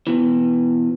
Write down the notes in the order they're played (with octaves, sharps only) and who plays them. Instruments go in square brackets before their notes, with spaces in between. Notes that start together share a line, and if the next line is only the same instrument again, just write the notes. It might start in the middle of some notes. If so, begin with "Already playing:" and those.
[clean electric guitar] B2 E3